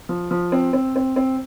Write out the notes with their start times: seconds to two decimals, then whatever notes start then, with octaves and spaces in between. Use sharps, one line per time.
0.09 F3
0.31 F3
0.52 C4
0.73 C4
0.96 C4
1.16 C4